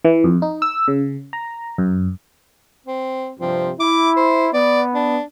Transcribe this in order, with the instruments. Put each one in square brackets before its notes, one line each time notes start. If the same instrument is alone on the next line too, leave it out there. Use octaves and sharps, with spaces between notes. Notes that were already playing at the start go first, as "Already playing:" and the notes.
[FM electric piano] E3
F2
D#4
E6
C#3
A#5
F#2
[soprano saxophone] C4
[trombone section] G2 C3 F3 [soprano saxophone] C4
[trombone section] E4 [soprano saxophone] D6
[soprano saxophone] C5
[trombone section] B3 [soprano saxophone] D5
[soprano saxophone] D4